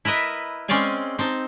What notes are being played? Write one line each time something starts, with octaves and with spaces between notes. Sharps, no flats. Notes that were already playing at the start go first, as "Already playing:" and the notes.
E4 A#4 B4 D#5 E5
G#3 C4 C#4 D5 F5 G#5
C4 D#4 A5